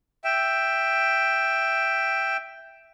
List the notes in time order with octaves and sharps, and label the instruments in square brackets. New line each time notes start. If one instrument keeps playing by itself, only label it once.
[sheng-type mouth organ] E5 G5